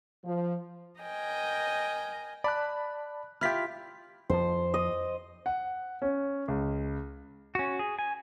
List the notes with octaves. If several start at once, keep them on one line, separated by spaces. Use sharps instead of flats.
F3
A#4 D#5 G5 G#5
D5 A5 B5 F#6
E4 F4 G4 F6 B6
F2 F3 C5
D#5
F#5
C#4
C#2
C#4 F#4
G#4
G#5